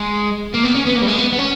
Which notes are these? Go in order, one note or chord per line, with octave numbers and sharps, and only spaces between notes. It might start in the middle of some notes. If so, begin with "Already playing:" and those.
Already playing: G#3
A#3
B3
C#4
B3
A#3
G3
G#3
B3
B3
C#4